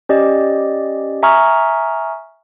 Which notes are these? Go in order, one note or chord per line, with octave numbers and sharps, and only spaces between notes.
C#4 G4 D5 D#5
E5 G#5 A#5 C#6 D#6 F6